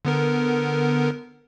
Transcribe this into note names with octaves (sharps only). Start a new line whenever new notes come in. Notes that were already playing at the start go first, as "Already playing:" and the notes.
D3 B3 A#4